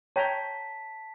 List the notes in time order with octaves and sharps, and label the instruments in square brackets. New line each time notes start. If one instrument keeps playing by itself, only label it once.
[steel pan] C#5 G5 A#5 [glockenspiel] A5 B6